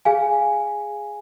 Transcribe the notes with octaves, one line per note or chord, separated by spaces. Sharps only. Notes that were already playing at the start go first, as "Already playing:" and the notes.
G#4 F5 G#5